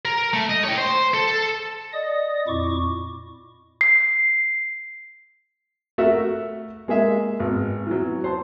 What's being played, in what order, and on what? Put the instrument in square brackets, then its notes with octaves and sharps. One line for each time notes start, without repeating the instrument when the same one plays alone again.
[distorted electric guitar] A#4
A3
D#5
C#5 G5
C5
A4
[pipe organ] D5 D#5 D#6
F2 A#2 E4 C#6 D6
[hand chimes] C7
[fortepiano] A3 F#4 A#4 E5 E6
G#3 A#3 G#4 E5
G#1 B3
E3 F#3
C5 A5